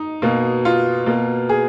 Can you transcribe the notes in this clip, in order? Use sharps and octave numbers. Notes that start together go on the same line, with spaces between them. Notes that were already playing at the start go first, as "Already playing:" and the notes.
Already playing: D#4
B2 A#3
F4
B2 A#3
G#4